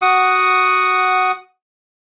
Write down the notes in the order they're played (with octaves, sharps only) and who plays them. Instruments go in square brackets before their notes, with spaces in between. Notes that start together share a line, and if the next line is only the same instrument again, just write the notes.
[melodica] F#4 F#5 D#6